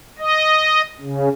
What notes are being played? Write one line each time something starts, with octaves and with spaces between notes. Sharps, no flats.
D#5
C#3